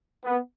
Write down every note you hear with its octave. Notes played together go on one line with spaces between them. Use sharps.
B3